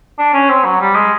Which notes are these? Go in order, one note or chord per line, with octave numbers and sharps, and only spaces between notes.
D4
C#4
C4
F#3
G3
G#3